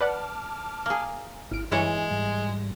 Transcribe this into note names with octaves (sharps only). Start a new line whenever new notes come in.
B4 D5 F#5 A5 D6 F6
A#3 G#4
G#1 E4 F6 D7
G2 E3 G#3 E4 C#5 F#5 C#7
G#2 G3 A#6